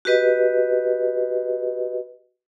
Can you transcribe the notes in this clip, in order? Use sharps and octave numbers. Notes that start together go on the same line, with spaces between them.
F#4 G4 B4 D#5